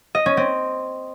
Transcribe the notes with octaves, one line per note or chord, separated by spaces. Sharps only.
D#5
C#4
C4